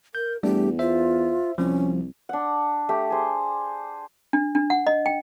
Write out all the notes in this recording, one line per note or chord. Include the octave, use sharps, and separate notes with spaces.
A#4 G6
E2 G3 A3 D4 G4
F4 C5 E5
C2 F3 G3 C#4
D4 F#5
A3 G4
G#4 C5
D4
D4
F#5
D#5
G5